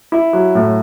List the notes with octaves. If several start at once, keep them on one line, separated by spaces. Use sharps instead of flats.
E4
F#3
A2